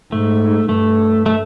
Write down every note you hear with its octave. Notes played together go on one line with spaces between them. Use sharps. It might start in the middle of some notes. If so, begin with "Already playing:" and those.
G#2 A3
G2 A3
A3